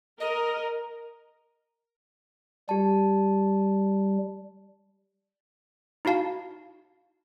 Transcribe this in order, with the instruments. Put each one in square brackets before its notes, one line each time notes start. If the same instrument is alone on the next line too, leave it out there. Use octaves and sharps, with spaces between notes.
[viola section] A#4 [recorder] D#5
[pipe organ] G3 [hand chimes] G4 A5
[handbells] D#4 E4 F#4 F5 A5